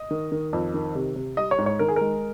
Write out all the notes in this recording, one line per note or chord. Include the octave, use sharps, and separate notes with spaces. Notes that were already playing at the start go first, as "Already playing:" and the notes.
Already playing: D#5
D#3
D#3
F2
D#3
C3
C3
G3 D#5
C#5
G#2
C#5
D#3 A#4
G#4
G#3 A#4